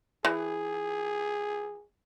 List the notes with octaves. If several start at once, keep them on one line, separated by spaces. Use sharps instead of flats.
E3 G#4